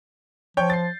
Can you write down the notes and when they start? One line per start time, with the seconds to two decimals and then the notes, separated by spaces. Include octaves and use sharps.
0.57 F3 C#5 G5 G6
0.70 A6 C7